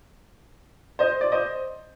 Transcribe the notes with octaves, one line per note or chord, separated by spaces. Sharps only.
C5 D#5
D5
C5 D#5